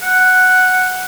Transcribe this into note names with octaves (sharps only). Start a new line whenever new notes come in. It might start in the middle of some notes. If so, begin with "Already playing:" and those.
F#5